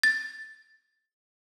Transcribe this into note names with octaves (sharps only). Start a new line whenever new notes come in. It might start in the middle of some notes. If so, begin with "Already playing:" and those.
A6